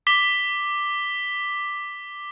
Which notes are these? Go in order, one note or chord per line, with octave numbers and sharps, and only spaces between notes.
D6 B6 G7